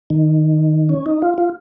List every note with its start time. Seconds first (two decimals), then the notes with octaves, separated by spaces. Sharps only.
0.10 D#3
0.89 C#4
1.06 D#4
1.22 F4
1.38 F4